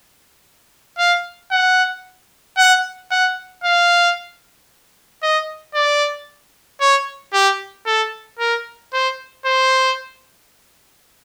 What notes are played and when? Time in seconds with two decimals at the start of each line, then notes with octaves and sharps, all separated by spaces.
0.99 F5
1.51 F#5
2.58 F#5
3.11 F#5
3.64 F5
5.23 D#5
5.75 D5
6.81 C#5
7.34 G4
7.86 A4
8.39 A#4
8.93 C5
9.46 C5